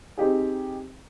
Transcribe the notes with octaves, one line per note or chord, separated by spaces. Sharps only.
C4 D#4 G4 G#4